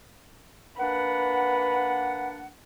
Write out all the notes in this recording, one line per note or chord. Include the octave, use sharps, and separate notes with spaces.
A#3 D4 B4 F#5